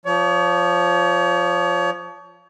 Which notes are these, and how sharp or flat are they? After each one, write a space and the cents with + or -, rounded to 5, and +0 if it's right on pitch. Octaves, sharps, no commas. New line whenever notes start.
F3 +0 C#5 +35